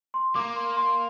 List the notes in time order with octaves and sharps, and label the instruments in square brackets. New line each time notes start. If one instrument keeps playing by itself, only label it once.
[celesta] C6
[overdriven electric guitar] A#3 [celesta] D6
[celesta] C6
C6